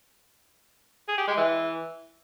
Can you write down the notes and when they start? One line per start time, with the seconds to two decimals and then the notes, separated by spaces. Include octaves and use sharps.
1.09 G#4
1.18 G4
1.28 G#3
1.37 E3